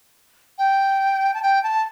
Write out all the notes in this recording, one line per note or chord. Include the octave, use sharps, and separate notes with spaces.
G5
A5
G5
A5